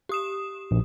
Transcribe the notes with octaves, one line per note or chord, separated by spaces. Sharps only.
G4 D#6 E7
A#1